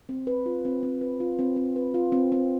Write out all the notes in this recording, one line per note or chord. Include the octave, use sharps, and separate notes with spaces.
C4
B4
F4
C4
C4
B4
F4
C4
C4
B4
F4
C4
C4